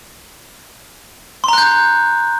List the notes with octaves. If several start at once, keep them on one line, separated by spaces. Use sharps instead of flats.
A#5 C6 F#6 G6